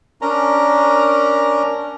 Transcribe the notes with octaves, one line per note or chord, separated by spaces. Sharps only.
C#4 D4 A#4 A#5